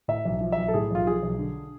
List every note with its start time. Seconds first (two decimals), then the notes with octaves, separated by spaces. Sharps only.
0.08 A2 E5
0.25 B1
0.41 F3
0.52 B1 E5
0.68 A4
0.74 A2 G#4
0.91 B1 F4
1.07 F3 G#4
1.23 B1
1.39 D3